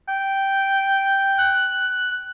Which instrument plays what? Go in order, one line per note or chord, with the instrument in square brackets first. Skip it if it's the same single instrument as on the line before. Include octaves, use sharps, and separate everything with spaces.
[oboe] G5
[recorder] F#6